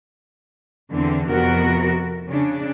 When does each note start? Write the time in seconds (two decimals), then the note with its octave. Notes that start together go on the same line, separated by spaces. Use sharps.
0.90 E2 D3 C4
1.28 F2 C3 B3 F#4 A#4
2.27 C#3 D4